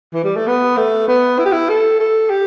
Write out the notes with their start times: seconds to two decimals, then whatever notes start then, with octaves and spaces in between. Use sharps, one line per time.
0.14 E3
0.24 G3
0.36 A3
0.47 B3
0.77 A3
1.08 B3
1.39 E4
1.46 G4
1.52 E4
1.69 A4
1.99 A4
2.30 G4